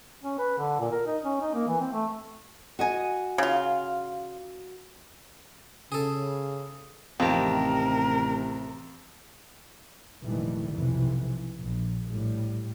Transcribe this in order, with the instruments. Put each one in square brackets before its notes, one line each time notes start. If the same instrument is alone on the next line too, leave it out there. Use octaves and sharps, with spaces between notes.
[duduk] C#4
B4
D3
A#2
A#4
D#4
C#4
D#4
A#3
E3
C4
A3
[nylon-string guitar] F#4 D#5 G#5
[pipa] C#3 F4
[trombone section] C#3 [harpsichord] G#4 A4
[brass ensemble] A1 C3 [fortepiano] F2 [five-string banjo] D#3 G4 [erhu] A#4
[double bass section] F1 A#2 D#3 E3 G3 A3
B1 F2 C3 E3
A#1
A2 G3